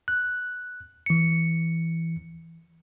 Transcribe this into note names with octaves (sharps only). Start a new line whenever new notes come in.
F#6
E3 C#7